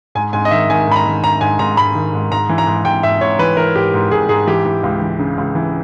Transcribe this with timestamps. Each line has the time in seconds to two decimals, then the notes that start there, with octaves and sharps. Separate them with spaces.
0.15 G#2 G#5
0.33 G#2 G#5
0.45 D#5
0.51 D#3 E5
0.69 D#3 G#5
0.87 G#2 B5
0.96 A#5
1.06 D#3
1.23 G#2 A#5
1.41 G#2 G#5
1.59 G#2 A#5
1.77 G#2 B5
1.95 D#3
2.14 G#2
2.31 G#2 A#5
2.49 E3
2.58 A#5
2.67 G#2
2.85 G#2 G5
3.03 G#2 E5
3.21 G#2 C#5
3.39 E3 B4
3.57 E3 A#4
3.76 G#2 G4
3.94 G#2
4.11 G#2 G#4
4.29 G#2 G#4
4.47 E3 G4
4.65 E3
4.84 C#2
5.02 E3
5.19 C#3
5.38 C#2
5.55 E3